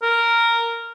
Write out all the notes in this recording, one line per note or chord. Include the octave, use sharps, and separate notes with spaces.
A#4